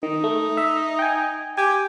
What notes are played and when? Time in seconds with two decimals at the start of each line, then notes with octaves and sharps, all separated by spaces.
0.03 D#3 D#4
0.24 A3
0.57 E5
0.99 G5 G#5
1.58 G4 G#5